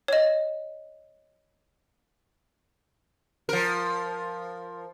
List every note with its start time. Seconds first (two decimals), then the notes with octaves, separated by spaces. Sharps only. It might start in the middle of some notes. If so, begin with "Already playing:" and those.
0.08 C#5 D#5
3.49 F3 A#4